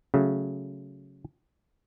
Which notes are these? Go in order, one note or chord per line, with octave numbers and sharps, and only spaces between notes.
C#3 F#3 A3